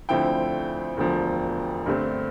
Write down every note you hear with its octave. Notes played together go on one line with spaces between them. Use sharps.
D2 D3 F3 C4 E4 G5
E1 D2 D3 F3
G2 D3 A3 C4